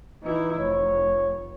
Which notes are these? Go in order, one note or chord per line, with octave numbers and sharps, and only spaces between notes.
E3 D#4 E4
F1 C#5